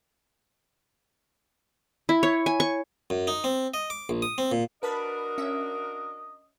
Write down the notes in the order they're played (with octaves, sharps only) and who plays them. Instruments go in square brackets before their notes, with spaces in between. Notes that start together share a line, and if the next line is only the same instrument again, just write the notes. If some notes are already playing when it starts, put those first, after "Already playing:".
[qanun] E4
C#5
G#5
C#6
[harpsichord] F#2
D#4
C4
D#5
D6
A#1
D#6
C4
A#2
[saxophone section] D4 F#4 A#4 [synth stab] B4 A5 B5 [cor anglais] D#5
[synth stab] C#4 E5